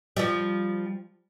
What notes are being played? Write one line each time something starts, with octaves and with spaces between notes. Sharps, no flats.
F3 G3